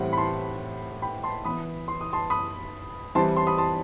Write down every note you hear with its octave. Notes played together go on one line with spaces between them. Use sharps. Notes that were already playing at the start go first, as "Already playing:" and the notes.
Already playing: A2 E3 G3 C4 F#5
B5
A5 C6
G5 B5
A5 C6
E3 B3 B5 D#6
C6
D#6
A5 C6
B5 D#6
E3 G3 C4 A5 C6
A5 C6
B5 D#6
A5 C6